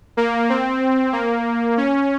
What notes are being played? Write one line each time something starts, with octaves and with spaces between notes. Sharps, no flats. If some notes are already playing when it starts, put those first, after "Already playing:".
A#3
C4
A#3
C#4